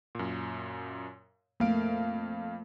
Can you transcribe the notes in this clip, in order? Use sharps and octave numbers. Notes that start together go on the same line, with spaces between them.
F#2 A#2
F2 A3 A#3 F5 D7